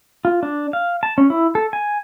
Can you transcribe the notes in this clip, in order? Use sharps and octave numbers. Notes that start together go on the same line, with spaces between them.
F4
D4
F5
A5
C#4
E4
A4
G#5